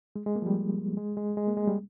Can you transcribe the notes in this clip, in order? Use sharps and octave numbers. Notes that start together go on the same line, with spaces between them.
G#3
G#3
A#3
F3
G3
G#3
G#3
G#3
A#3
G#3
G3